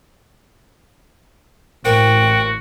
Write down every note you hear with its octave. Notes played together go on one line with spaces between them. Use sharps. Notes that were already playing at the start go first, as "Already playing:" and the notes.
A1 A#3 F#4 A#4 C5 G5